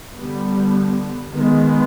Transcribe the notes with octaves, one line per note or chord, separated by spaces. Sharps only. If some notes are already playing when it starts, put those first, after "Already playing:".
D3 G3 B3
D#3 G#3 B3